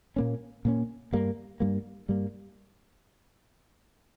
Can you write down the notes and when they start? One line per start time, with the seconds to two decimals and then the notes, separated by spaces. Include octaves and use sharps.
0.16 A#2 A#3 C#4
0.65 A#2 A#3 C#4
1.13 G2 G3 A#3
1.60 G2 G3 A#3
2.09 G2 G3 A#3